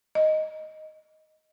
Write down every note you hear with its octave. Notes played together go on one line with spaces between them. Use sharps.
D#5